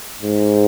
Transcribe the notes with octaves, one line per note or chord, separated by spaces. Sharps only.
G#2